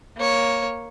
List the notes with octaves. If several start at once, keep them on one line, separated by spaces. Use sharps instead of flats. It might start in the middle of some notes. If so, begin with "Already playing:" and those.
A#3 C#5